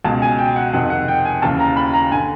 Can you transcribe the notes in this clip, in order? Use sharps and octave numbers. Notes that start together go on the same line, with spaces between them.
C#2 B2 A5
G#5
G5
F#5
F2 C3 D#3 F#5
F#5
G5
G#5
D#2 C#3 E3 A5
A#5
B5
A#5
D3 G#5